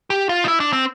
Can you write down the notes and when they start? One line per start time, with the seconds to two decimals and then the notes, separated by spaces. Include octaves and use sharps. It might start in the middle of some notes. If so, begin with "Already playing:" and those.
0.10 G4
0.29 F4
0.44 D#4
0.48 E4
0.60 D4
0.73 C4